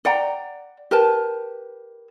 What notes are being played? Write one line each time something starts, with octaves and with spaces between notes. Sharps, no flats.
D5 F#5 G5 A#5
G4 A#4 B4 A5